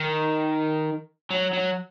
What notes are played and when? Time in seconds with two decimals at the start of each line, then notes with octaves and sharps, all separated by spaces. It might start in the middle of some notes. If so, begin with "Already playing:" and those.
Already playing: D#3
1.30 F#3
1.53 F#3